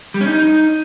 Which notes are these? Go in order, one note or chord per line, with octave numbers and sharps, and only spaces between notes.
G3
C#4
D#4